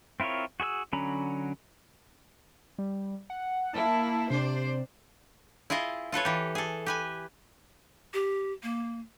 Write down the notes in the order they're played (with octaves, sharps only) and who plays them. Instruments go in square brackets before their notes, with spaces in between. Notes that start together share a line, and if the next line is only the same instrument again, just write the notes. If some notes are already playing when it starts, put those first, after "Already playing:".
[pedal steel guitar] C4 E4 F4 A#4 C#5
F#4 G#4 C5 E6
D3 F#3 C#4 A#5 B5
[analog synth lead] G3
F#5
[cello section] A#3 E4 [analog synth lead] A5
[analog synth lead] C3 [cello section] D4 C5 D5
[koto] E4 F4 G#4 D#5
F4 A4 B4 C#5
E3 G4
G#4 A4
G4 B4 G#5
[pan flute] G4
A#3